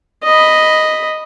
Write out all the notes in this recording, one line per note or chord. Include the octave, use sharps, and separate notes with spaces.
D#5 B5